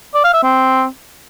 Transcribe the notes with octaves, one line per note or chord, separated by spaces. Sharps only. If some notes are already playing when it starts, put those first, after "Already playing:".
D5
F5
E5
C4